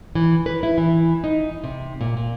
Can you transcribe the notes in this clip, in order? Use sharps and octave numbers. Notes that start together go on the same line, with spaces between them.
E3
B4
E4
E3
D#4
C3
A#2
A#2